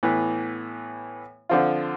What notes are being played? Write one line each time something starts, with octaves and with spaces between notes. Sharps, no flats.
A2 E3 B3
D3 F3 C4 F4